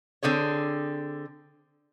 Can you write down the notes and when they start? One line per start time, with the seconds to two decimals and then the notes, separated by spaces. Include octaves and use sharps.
0.23 D3 C4 G#4 C#5